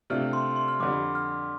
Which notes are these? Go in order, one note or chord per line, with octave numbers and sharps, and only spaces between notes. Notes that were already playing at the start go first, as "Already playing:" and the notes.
C3 A3 D4 F4 F6
C6
C6
F6
F2 D3 G3 D6
F6